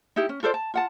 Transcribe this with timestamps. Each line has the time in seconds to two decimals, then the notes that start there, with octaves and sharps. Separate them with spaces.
0.16 D#4 E4 G4
0.29 C#4
0.43 F4 A4 C5 D5
0.54 A5
0.74 F4 F#5 A5